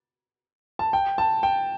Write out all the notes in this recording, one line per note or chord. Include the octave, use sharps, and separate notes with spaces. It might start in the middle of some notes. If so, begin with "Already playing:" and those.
A5
G5
A5
G5